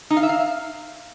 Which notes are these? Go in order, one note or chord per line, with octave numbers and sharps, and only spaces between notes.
D#4
F5
E5
F5